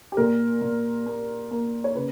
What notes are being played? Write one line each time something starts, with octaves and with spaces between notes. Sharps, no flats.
G4
A#2 A#4
A#2
A#3
A#3
C#5
C#3 B4